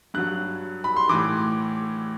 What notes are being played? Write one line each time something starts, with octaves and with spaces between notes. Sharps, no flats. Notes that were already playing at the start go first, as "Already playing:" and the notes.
G2 F#3 F#6
B5
C6
A2 E3 D6